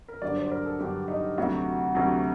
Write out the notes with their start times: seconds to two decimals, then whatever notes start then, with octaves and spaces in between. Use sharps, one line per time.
0.08 A#4
0.22 G2 D3 F#3 D5
0.36 C5
0.46 C5
0.51 A#4
0.66 A4
0.79 G2 D3 F#3 G4
1.08 D#4
1.38 D2 C3 F#3 F#4
1.95 D2 C3 F#3